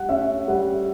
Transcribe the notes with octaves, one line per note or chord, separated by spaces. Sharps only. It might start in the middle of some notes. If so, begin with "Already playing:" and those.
Already playing: G3 F#5
C#4 E5
G3 F#5